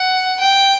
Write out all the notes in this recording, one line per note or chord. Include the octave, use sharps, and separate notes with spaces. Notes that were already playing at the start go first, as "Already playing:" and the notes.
Already playing: F#5
G5